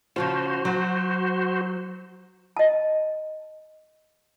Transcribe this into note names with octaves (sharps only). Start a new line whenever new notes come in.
C#3 F3 F4 F#4 C5
F#3
D#5 A5